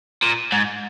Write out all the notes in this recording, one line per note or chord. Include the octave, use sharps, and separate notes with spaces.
A#2
G#2